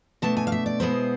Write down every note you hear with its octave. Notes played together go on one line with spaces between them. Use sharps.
B2 A3 D4 A5
G#5
F5
E5
D5
B2 G#3 B3 E4 C5